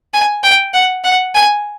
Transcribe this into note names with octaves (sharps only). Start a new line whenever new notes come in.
G#5
G5
F#5
F#5
G#5